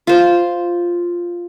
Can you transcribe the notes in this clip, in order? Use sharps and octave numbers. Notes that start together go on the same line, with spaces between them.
F4 C5